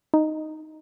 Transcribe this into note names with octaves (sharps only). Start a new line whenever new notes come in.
D#4